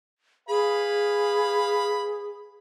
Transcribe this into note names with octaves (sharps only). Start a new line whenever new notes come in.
G#4 B4 F5 B5